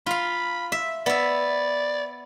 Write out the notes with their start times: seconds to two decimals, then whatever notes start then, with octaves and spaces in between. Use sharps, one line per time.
0.06 F4 F5 B5
0.72 E5
1.06 B3 D5 E5